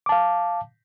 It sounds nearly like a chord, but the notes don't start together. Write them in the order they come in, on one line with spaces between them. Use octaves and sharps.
D6 A5 F5